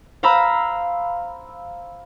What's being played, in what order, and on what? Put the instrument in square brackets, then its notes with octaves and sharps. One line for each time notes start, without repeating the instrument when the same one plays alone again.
[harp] C5 F5 A#5 B5 E6